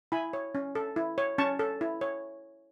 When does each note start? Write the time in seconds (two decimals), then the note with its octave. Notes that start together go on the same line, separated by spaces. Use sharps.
0.12 E4 G#5 B5
0.33 C#5
0.55 C#4
0.75 A4
0.96 E4
1.18 C#5
1.38 C#4 A5 C#6
1.59 A4
1.81 E4
2.01 C#5